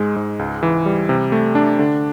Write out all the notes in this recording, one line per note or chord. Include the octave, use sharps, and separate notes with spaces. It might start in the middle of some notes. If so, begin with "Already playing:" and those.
Already playing: G#2 G#3
G#2
C#2
E3
G3
C3
A3
D4
D3